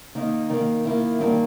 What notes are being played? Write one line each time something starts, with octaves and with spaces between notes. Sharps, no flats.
D#3 A#3 D#4
D#3 G3 A#3
D#3 A#3 E4
G2 D#3 A#3